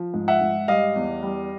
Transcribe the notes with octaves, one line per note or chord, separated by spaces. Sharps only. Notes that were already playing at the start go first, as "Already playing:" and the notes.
Already playing: F3
G#2
E5 F#5
G#2
G3 D#5 F5
E2
G3